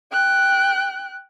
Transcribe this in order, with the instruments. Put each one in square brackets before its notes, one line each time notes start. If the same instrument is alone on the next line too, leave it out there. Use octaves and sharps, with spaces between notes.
[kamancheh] G5 F#6